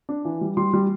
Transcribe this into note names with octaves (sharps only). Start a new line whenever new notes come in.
D4
E3
G3
G3 C6
G3